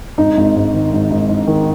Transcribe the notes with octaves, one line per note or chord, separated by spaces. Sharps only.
G#1 D#4
G#1
G#2
D#3
G#1
G#1
G#2
D#3